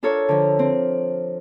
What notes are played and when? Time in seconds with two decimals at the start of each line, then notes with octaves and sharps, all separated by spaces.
0.03 D4 F4 A4 A#4 C#5
0.29 D3 F3
0.59 C4